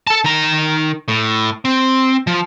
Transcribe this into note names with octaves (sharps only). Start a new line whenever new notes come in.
A4 A5
D#3 A#5
A2
C4
F3